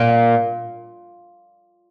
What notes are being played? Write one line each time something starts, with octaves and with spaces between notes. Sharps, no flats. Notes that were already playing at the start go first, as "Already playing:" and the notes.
Already playing: A#2